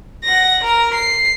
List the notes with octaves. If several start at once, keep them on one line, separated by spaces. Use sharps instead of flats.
F#5 A#6
A#4 A#5
C7